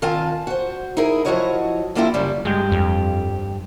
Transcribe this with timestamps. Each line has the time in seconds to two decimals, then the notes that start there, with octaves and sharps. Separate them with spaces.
0.02 D#3 C4 F4 F5 G#5 A5
0.47 F#4 C5
0.97 D#4 E4 G#4 A#4
1.25 F3 F#3 E4 F#4 C#5 D#5
1.95 G3 A#3 C4 D4 E4 F4
2.14 F#2 C#3 G3
2.45 G2 G#3 G4
2.72 F2